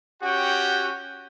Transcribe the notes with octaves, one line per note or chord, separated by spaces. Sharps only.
C#4 F#4 G4 F#5 G5